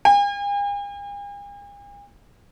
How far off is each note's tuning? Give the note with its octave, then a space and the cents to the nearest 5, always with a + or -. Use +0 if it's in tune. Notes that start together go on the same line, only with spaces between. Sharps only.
G#5 -45